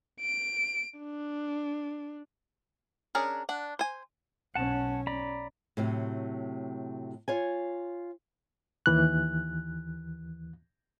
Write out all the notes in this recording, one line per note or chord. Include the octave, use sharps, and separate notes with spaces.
D7
D4
C#4 D4 G#4 A#4
D4 F#5
C5 G#5
B1 C#4 F#5 A5
D5 A#5 B5
A2 C3 F#3
F4 C#5 G#5
D#2 E3 F#6